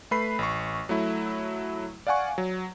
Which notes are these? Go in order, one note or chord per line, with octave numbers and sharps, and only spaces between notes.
A3 B4 B5 C7
A1 C#6
F#3 A3 E4
D5 F5 F#5 G#5 C#6
F#3